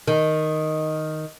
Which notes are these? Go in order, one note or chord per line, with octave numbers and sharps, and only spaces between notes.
D#3